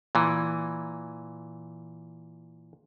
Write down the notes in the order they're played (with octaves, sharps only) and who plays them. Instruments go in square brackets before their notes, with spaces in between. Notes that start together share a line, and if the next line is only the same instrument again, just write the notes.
[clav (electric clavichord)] A#2 E3